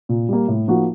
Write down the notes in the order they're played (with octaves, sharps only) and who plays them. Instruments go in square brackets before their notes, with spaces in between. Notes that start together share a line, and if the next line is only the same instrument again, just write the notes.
[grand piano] A#2
G3 A#3
A2
F3 A#3 D#4 F#4